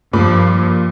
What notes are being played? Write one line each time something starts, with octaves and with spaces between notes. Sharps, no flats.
G2 A#2 F3 B5 D6